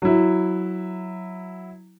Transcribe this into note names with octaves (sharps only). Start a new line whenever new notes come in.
F#3 E4